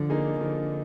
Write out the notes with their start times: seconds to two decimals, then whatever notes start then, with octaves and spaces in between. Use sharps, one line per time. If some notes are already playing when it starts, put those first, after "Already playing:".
Already playing: D3 F3
0.10 A#3 D#4 G#4
0.40 D3 F3